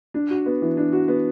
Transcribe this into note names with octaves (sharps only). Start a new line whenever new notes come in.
D4
F#4
B3
E3
D4
F#4
B3